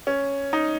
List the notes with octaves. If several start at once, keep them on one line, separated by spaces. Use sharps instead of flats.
C#4
D#4